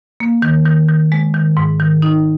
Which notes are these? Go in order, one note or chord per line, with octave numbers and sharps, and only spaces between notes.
A#3
D#3
D#3
D#3
G#3
D#3
G#2
D#3
D#4